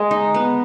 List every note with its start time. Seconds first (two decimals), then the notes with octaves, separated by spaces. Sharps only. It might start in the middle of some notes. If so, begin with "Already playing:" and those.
Already playing: G#3
0.11 D#4
0.34 B3